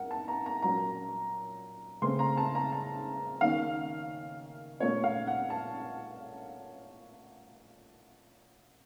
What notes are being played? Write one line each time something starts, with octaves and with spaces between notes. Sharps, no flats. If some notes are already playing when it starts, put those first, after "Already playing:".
Already playing: A#4 F#5
A5
A#5
A#5
A#2 F#3 A#3 C#4 A#5
C#3 A3 C4 C6
A#5
A5
A#5
A5
D#3 A#3 C#4 F5
A#2 A3 C#4 C#5
F5
F#5
A5